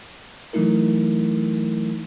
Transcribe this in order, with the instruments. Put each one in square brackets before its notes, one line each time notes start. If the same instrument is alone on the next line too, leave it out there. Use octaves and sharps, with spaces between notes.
[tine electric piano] E3 F#3 A3 D#4 E4 A#4